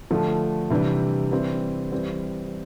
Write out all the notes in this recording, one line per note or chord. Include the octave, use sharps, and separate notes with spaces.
D3 F3 A3
C3 E3 G3 D4
E3 G3 C4
E3 G3 C4